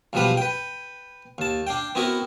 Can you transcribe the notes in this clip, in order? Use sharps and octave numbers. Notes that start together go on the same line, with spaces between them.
B1 E2 F3 G3 B4 F#5
B4 G5
D#2 A5
D4 F5 G5
B3 C4 E4 F#4 A#4